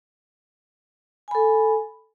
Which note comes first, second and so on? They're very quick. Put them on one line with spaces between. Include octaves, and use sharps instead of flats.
G#5 B5 A4